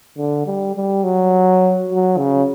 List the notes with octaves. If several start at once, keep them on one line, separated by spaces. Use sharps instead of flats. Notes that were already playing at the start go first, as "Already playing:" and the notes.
D3
G3
G3
F#3
F#3
C#3